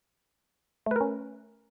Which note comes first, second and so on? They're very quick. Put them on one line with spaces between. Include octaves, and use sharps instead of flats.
A3 B4 A#4 C#4